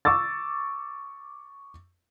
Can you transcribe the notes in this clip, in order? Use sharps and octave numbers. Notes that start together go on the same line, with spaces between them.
C#6 D6 E6 A6